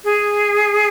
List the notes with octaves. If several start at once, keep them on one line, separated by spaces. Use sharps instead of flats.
G#4